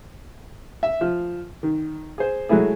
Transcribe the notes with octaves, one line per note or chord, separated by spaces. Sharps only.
E5
F3
D#3
G#4 C5
F#3 G#3 A3 E4 G#4